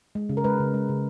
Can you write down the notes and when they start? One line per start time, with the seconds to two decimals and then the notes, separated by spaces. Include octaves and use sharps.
0.15 G#3
0.29 C#3
0.37 A#4
0.44 G#3 B4
0.60 C#3
0.74 G#3
0.89 C#3